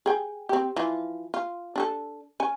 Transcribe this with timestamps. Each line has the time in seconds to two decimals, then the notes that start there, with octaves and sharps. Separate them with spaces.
0.06 G#4 G5
0.49 C4 G4
0.76 E3 F3 F4
1.34 F4
1.76 D4 G#4 A4
2.40 C#4 G#5